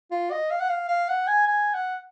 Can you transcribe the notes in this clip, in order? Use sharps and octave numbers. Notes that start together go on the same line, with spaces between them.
F4
D#5
F5
F#5
F5
F5
F#5
G#5
G#5
F#5